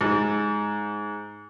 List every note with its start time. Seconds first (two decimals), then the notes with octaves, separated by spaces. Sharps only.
0.01 G#2